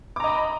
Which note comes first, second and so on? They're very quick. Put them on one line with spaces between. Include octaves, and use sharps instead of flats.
D6 A#5 D#5 B5